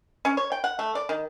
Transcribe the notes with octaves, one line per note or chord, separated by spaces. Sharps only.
C#4
C#5
G5
F#5
A3
D5
D#3